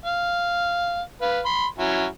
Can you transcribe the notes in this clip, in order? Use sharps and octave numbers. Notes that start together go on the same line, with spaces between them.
F5
B4 F5
B5 C6
F#3 C#4 E4